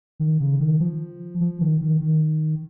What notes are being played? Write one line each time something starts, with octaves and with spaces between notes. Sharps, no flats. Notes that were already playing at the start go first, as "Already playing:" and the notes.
D#3
C#3
D#3
F3
F3
D#3
D#3
D#3